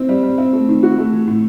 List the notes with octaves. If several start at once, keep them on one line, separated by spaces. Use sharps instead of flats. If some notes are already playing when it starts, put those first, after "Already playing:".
Already playing: C4 E4
G3
G3
C4
A3
D#3
F#4
A3
E3
A2